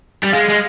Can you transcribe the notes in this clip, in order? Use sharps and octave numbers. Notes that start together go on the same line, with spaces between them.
G3
G#3 F5
G#3